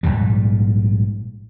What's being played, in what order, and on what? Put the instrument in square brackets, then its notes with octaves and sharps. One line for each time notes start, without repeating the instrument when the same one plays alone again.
[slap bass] A#1 E2 G#2 G3